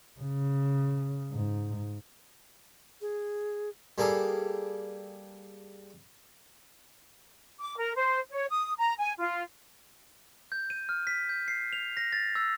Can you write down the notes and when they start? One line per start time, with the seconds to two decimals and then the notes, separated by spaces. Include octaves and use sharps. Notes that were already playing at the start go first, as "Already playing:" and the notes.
0.20 C#3
1.32 G#2
3.01 G#4
3.98 G3 A#3 G#4 A4
7.60 D6
7.77 A#4
7.96 C5
8.30 C#5
8.50 D#6
8.78 A#5
8.99 G#5
9.19 F4
10.52 G6
10.70 D#7
10.89 F6
11.07 B6
11.29 G6
11.48 C7
11.73 F7
11.97 A#6
12.12 A6
12.35 E6